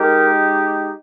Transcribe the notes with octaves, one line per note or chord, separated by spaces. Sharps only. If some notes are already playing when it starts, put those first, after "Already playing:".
Already playing: G#3 D#4 G4 A#4